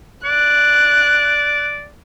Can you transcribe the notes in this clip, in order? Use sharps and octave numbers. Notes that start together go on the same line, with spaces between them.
D5 F#6